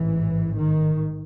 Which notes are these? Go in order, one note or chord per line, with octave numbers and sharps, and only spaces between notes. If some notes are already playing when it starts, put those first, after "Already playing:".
Already playing: A1 G#2 E3
D#3